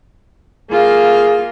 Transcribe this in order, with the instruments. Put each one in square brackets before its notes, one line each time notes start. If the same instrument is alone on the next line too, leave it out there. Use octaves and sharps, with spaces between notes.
[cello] A#3 F4 [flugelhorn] G#4